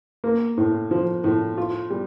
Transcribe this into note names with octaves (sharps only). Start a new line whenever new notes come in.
A#3
A2
F3
A2
F4
G3